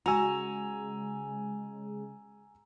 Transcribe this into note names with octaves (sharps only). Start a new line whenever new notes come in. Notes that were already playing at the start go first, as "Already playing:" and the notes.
C#3 G#3 F#4 G#5 A#5 E6 F7